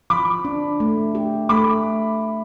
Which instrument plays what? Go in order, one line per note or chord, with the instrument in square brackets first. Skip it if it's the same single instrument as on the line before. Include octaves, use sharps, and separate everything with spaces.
[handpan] F3 [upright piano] B5 D6
[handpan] D4
A3
G4
[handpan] A3 [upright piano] B5 D6